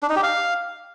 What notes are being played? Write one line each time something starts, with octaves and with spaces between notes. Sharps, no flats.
D4
D#4
G4
F5